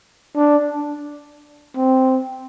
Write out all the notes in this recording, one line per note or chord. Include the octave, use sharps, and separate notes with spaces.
D4
C4